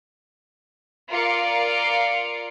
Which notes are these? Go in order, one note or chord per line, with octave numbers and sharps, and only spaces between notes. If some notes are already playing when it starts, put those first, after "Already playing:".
F4 A#4 D5 F5 D6 C#7